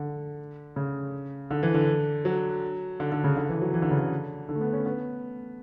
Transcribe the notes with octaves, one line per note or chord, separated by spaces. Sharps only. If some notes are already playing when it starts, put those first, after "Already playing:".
Already playing: D3
C#3
D3
E3
D3
F#3
D3
D3
C#3
D3
E3
F#3
E3
D3
C#3
D3
D3
A3
B3
C#4
B3